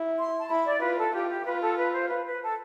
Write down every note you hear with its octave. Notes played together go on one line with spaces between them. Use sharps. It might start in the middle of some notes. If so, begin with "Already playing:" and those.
Already playing: E4
C6
A5
E4 B5
D5
F4 B4
A4
F4 G4
G4
F4 B4
A4
B4
C5
B4
B4
A4